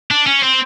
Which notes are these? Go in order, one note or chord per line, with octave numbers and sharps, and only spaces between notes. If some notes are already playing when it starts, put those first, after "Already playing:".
D4
C#4
C4